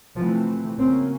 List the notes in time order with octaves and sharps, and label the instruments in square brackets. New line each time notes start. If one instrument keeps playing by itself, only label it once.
[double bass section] C3 E3 A3 C4 [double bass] F3
[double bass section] C#3 F#3 A#3 C#4 [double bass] C4